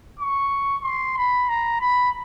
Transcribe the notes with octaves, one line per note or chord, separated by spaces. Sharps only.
C#6
C6
B5
A#5
B5